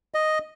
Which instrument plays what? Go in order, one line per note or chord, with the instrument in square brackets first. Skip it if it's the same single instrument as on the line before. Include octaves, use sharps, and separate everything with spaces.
[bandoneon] D#5